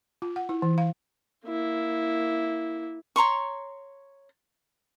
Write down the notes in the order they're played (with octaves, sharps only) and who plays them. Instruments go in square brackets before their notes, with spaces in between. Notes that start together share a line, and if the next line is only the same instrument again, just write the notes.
[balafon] F4
F#5
E4
E3
F5
[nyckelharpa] A#3 E4
[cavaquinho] C#5 A#5 C6 C#6